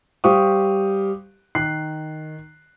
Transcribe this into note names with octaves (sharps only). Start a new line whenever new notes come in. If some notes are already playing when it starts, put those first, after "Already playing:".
G3 G4 C5 F5 C#6 D#6
D#3 F#6 C7